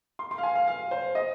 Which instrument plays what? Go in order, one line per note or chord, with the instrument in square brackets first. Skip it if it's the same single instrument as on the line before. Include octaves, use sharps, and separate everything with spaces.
[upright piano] C6
C6
F5
G#5
F5
F5
C5
D#5